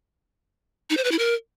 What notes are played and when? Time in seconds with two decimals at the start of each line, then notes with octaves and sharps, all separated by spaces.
0.90 D#4
0.97 C5
1.04 B4
1.12 E4
1.19 A#4